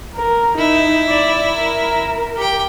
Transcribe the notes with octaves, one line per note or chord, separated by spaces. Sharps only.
A#4
D#4 E4
D5
A#4
G4 G5